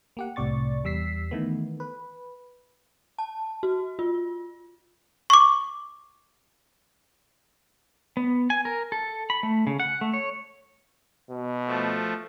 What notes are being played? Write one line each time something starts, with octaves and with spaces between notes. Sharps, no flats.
A#3 G4 F#5
C2 A2 C3 D5 C#6 A6
E2 G3 E6 B6 C7
D#3 E3 A3 B3
B4
A5
F#4
F4
C#6 D6
B3
G#5
A#4
A4
B5
A3
C#3
F#5
A3
C#5
B2
F3 A3